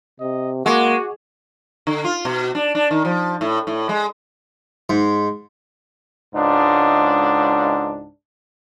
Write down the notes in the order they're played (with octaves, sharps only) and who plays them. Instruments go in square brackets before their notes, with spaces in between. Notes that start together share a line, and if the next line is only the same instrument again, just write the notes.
[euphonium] C3 [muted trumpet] D#5
[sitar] G#3 [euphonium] A#3 [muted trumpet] F#4 [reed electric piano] F#5 C#6 D6
[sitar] D3
F4
B2
D4
D4
D#3
F3
A2
A2
G#3
[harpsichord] G#2
[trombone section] C#2 G#2 D4